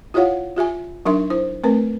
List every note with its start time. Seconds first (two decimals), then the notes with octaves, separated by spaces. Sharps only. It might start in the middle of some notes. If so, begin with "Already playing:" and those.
0.14 E4 F4 G4 C#5 F5 F#5
0.57 F4 G4 E5 G#5
1.05 F#3 D4 D#4 A#4 E5 C6
1.30 E4 C5
1.64 A3 C4 A#4 B4